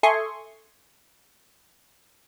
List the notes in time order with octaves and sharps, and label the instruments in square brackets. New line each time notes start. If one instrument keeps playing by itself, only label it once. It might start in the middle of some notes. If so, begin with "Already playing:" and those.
[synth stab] A4 E5 G#5 C6 C#6 D#6